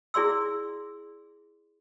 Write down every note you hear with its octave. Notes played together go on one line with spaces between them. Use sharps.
E4 G#4 D5 C6 E6